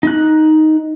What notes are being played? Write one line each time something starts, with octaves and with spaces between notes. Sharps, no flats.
D#4 F#6